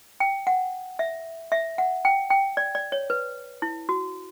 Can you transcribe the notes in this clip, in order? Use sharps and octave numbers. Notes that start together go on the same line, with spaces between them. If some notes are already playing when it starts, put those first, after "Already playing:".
G5
F#5
E5
E5
F#5
G5
G5
D5
D5
C#5
B4
E4
F#4